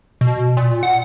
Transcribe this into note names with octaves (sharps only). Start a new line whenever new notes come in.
B2
A#2
F#5